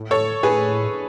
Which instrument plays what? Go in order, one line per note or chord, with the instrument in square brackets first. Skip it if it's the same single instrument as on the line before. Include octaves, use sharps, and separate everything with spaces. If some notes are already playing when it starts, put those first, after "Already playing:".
Already playing: [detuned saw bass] A2
[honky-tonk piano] A4 C#5
[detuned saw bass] A2 [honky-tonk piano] G#4 B4